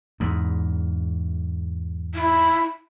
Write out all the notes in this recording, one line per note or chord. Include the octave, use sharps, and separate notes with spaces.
E2 G#2
E4